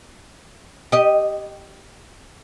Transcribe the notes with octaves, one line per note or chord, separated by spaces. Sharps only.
G4 D#5